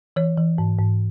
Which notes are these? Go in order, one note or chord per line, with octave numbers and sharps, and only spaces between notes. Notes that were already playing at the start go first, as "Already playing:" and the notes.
E3 C#5
E3
G#2
G#2